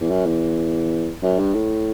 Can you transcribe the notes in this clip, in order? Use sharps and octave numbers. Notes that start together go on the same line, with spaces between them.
E2
F#2
E2
F#2
G2
A2